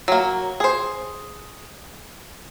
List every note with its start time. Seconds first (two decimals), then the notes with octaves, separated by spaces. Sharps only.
0.08 F#3 A#3
0.60 G#4 C5